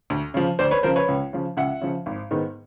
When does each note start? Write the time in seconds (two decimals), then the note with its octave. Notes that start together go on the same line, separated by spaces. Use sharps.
0.10 D2
0.34 C#3 F3
0.59 D2 C5 D5
0.71 B4 C#5
0.83 C#3 F3 A#4 C5
0.96 B4 C#5
1.08 C#2
1.33 C#3 F3
1.57 C#2 E5 F#5
1.81 C#3 F3
2.06 G#1
2.31 G#2 D#3 G#3 B3